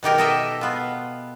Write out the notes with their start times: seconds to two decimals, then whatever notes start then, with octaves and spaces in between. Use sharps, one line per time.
0.03 B2 D#3 G4 A#4
0.18 A4 D#5 E5
0.61 B3 F4